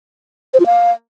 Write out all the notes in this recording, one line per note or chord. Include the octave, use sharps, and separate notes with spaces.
C5
F4
F5